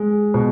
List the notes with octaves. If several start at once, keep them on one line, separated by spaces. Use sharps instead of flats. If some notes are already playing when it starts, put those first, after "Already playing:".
Already playing: G#3
B2